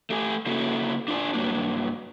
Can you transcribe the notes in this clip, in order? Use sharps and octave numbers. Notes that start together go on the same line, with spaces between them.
A3 G4 G#5
C#3 A#3 C#4 E4 F#4 A4
D4 F4 D5 G#5
G2 F#3 A#3 D4